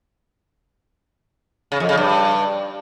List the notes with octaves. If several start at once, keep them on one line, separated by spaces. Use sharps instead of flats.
C#3
F2
C#3
G2